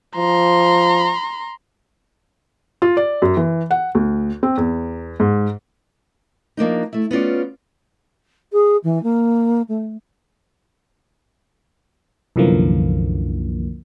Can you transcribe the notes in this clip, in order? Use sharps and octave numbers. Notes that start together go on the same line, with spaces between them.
F3 A#5 C6
F4
D5
F#2
E3
F#5
D2
C4
E2
G#2
F3 A#3 D4 D#4
A3 E4
B3 C#4 F4 D5
G#4
E3
A#3
A3
C2 F#2 D3 E3 F3 A#3